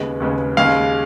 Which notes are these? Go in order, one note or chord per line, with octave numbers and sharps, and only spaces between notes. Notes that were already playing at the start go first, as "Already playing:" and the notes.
Already playing: D#2 C#3 G#3 B3
D#2 C#3 G#3 B3
D#2 C#3 G#3 F5